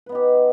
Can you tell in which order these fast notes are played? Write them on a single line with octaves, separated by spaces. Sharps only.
B4 B3 D#4 G4